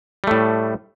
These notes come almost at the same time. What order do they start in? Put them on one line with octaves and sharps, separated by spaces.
G3 A3 A2